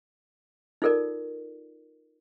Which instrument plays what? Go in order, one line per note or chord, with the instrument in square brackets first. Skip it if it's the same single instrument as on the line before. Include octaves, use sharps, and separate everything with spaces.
[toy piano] D#4 F4 A4 A#4 D5